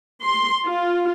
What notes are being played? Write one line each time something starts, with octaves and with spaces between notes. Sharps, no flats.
C6
F4